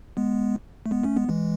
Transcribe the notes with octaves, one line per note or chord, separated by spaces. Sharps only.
G#3 B3
A3
G#3 B3
A3 C#4
G#3 B3
E3 G#3